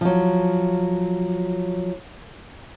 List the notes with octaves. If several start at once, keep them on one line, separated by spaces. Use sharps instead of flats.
F3 F#3